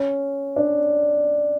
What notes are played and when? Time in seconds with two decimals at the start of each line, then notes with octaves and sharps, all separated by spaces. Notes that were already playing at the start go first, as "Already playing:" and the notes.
Already playing: C#4
0.56 D4